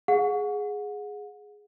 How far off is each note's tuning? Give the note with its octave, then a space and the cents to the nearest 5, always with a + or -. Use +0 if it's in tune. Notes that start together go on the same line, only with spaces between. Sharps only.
G#4 +0 F#5 -30